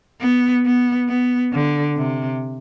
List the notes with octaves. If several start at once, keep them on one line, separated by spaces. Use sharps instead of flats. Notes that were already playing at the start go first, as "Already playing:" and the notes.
B3
B3
B3
D3
C3